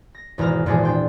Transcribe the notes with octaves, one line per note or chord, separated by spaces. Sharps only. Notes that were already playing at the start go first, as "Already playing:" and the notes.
A#6
G#1 E2 B2 A#5 F6
G#1 E2 A#2 G#4 A5 D6
D4 G5 C6